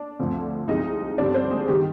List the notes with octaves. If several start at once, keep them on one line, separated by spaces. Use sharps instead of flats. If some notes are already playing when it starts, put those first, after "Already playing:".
Already playing: D4 D5
D2 D3 F3 C4
C2 C3 F3 G#3 D#4 D#5
G2 D3 G3 C4 D4 D5
C4 C5
G#3 G#4
D#3 G3 G4